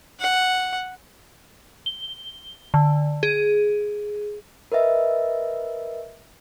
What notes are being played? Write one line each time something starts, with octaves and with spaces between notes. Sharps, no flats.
F#5
G7
D3
G#4
A#4 B4 D#5 E5